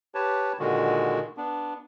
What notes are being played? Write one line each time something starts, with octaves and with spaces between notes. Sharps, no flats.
G4 B4 C#5 A5
A#2 D3 D#3 G#3 F#4
B3 D4